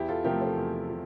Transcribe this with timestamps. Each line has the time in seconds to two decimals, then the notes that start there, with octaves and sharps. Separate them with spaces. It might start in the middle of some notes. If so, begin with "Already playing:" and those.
Already playing: E2 E4 G4
0.08 F4 A4
0.24 C3 F3 A3 G4 A#4
0.41 A4 C5
0.57 E2
0.90 C3